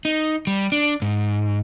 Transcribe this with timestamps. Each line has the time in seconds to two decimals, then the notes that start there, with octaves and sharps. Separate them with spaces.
0.05 D#4
0.47 G3
0.72 D4
1.02 G#2